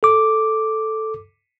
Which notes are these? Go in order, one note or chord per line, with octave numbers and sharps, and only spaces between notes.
A4 D6